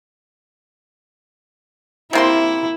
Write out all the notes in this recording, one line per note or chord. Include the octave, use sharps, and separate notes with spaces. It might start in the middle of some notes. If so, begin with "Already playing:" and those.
C3 A#3 E4 C6